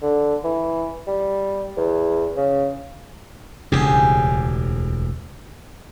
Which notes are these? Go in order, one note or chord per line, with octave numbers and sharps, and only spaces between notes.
D3
E3
G3
E2
C#3
E1 D2 A2 C#3 D4 G4 G#4